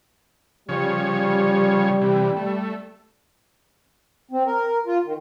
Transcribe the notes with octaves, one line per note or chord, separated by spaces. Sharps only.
C#3 F3 G3 C#5
C3 E3
A3
C4
A#4
F4
D#3